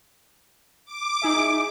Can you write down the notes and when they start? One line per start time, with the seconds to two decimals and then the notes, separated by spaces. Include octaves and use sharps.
0.85 D6
1.22 D#4 G#4 E5